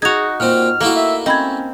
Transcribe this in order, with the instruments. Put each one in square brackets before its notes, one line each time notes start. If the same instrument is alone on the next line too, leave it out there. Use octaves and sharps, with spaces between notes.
[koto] D#4 F#4 [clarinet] G#4 [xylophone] G#6 F7
[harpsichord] A#2 C4 [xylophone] F#5 [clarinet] F6
[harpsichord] A3 E4 F#4 [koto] A#3
[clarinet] E5
[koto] C4 [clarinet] C#4 [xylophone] D#5 B5 G#6